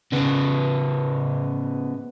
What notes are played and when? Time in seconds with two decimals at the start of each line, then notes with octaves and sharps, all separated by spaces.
0.12 C#3 B3